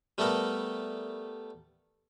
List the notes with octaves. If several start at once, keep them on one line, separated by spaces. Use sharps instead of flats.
G3 A3 B3 A4 A#4